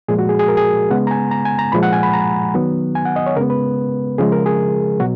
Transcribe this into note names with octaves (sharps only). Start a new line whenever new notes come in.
A#2 F3 G#3 G#4
F#4
G#4
G#4
A#4
G#4
C#3 G#3 B3 F#5
A#5
G#5
A#5
G#5
A#5
A#2 F3 G#3 B5
F#5
G#5
B5
A#5
D#3 F#3 B3
G#5
F#5
D#5
C#5
C#3 G#3 B3 A#4
B4
C#3 F3 G#3 G#4
A#4
G#4
B2 F#3 F#4